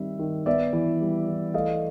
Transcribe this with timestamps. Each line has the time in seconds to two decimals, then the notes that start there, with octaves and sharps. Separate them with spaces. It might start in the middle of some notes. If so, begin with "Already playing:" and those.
Already playing: D#3 G3 C4 E5
0.19 D#3
0.46 B3 D5 E5
0.73 E3
1.01 G3
1.27 E3
1.54 A3 D#5 F5